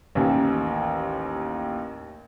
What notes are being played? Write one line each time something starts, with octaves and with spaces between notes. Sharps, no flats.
A1 D#2